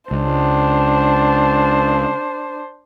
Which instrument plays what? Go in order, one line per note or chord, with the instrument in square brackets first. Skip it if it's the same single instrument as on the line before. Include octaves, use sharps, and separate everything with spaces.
[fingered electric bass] C#2 [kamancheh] D4 C5